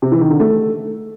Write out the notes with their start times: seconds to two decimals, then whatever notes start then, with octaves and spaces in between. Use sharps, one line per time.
0.02 C3
0.12 E3
0.21 D#3
0.30 D3
0.40 A3